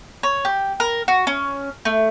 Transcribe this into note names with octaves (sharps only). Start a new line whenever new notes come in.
C#5
G4
A#4
F#4
C#4
A3